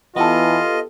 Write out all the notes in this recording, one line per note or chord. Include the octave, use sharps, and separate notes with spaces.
E3 B3 F4 G4 A4 D#5